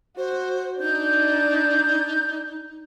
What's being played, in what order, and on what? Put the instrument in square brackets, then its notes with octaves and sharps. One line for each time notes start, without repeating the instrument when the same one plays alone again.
[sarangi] F#4 [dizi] C5
[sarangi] D4 [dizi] D#4 [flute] G6